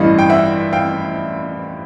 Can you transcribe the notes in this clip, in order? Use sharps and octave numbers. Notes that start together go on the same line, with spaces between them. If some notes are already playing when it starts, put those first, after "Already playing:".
Already playing: A1 G2 E3 G3 D#5 F5
G5
E5 F#5
F5 G5